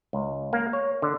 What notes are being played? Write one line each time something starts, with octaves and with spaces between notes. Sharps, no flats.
C#2
A#3
C#5
D3